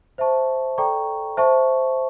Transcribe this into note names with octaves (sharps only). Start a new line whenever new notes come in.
C5 E5 A5 C#6
A4 D5 G5 A#5 C#6
C5 E5 A5 C#6